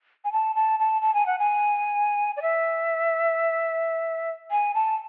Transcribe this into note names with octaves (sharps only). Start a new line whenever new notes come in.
G#5
A5
A5
A5
A5
G#5
F#5
G#5
D5
E5
G#5
A5